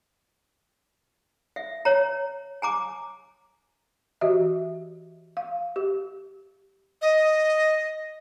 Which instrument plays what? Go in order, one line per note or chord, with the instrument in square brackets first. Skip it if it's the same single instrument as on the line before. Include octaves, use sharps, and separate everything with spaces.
[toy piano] E5
C#5 A#5
G#5 A#5 D6
[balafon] E3 F#4 G4 D#5 E5
F5
G4
[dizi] D#5